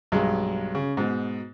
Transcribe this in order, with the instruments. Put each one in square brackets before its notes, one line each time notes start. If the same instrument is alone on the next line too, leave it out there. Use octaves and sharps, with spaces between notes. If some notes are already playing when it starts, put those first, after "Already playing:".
[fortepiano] B1 G2 G#3
C#3
G#2 B2